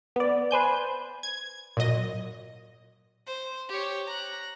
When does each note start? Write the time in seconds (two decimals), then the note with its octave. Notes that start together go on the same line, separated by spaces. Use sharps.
0.16 B3 D5
0.51 B4 C5 G#5 G6
1.23 G#6
1.77 A#2 F#3 D#5 A#6
3.26 C5
3.69 G4 C#5
4.07 A#5 F#6